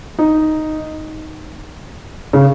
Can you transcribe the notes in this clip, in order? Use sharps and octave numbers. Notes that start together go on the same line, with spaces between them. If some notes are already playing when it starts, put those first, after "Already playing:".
D#4
C#3